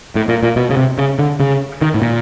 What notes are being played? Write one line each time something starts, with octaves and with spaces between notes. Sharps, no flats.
A2
A#2
A#2
B2
C#3
C3
C#3
D3
C#3
D#3
A2
A#2